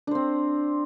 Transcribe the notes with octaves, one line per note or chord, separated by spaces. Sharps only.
C4 D4 C5